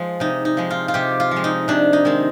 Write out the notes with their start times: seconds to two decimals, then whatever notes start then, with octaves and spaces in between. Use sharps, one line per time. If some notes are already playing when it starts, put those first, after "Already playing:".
Already playing: F3 G#3
0.20 C3 D#4
0.45 D#4
0.57 F3 G#3
0.70 F4
0.88 F4
0.94 C3 G4
1.20 F4
1.31 F3
1.36 G#3
1.44 D#4
1.68 C3 D4
1.93 D#4
2.05 D#3 G#3 C4